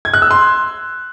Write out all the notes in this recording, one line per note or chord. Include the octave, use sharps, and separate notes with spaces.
G#6
F#6
E6
C6